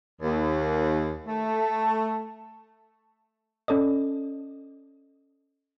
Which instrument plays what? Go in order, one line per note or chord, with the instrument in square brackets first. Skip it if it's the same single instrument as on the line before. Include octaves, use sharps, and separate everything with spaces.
[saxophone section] D#2
A3
[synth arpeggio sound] C#4 A4 D5 D#5